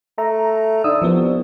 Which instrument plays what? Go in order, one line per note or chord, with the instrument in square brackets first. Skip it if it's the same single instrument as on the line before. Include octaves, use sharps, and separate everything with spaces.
[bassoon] A3 [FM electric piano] A#5
[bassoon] D3 [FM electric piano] D#4 D#6 E6
[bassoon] C2 [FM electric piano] F3 B3